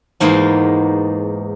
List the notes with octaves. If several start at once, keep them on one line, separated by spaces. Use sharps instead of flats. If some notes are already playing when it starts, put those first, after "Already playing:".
E2 G#2 G#3 A#3 B3 D#4